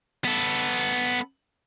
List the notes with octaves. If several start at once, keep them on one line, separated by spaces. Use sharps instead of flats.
B3 A4